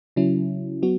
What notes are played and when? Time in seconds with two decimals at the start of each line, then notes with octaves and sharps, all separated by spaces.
0.16 C#3 F#3 C#4 E4
0.83 F#3 B3 F#4